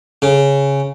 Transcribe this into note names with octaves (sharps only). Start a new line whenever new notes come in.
C#3